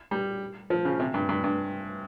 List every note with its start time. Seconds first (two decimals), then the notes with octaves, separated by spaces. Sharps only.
0.11 G3
0.70 F3
0.85 C#3
1.00 C3
1.14 G2
1.29 G2
1.44 G2